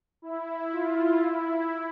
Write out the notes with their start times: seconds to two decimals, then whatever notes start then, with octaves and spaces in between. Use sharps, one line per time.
0.22 E4
0.72 F4
1.23 E4